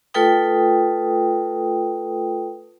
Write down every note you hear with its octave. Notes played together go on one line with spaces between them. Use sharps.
A3 F4 A4 B4 G5 D#6